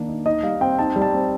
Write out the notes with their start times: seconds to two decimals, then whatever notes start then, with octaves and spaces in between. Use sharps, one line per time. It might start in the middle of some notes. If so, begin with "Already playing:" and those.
Already playing: D#3 A#3 D4
0.08 D#4
0.26 D#4 D#5
0.43 G3 F5
0.61 C4 G5
0.79 D#4 A5
0.96 G3
1.02 A5
1.14 C4